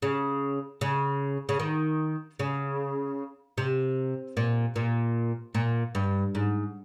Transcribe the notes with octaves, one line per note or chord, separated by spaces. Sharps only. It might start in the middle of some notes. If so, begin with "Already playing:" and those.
C#3
C#3
C#3
D#3
C#3
C3
A#2
A#2
A#2
G2
G#2